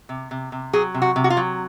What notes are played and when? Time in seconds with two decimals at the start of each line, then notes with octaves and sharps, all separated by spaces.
0.09 C3
0.31 C3
0.52 C3
0.73 F#3 G#4
0.94 C3
1.02 F#4
1.16 C3
1.24 F#4
1.30 F4
1.37 F#3